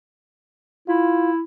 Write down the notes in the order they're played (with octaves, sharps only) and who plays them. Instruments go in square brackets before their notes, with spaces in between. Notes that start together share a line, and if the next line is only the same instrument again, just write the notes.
[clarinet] E4 [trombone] F4